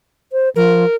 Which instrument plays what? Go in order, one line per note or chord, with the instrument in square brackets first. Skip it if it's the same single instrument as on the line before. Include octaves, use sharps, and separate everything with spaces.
[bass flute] C5
[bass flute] F3 [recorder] A#4